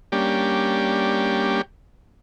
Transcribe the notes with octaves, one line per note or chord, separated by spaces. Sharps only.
G3 A#3 C#4 D4 G4